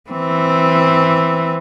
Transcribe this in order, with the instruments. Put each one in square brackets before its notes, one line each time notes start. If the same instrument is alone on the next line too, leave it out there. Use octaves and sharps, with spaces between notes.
[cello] E3 C4